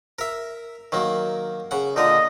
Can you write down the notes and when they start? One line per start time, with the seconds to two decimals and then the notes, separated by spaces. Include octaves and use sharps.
0.19 A#4 E5
0.92 D#3 F#3 A#3
1.71 C#3 F#5
1.96 A#2 D3 A#4 D#5